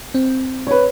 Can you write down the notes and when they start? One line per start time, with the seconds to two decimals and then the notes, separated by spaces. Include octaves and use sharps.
0.14 C4
0.67 B4 C#5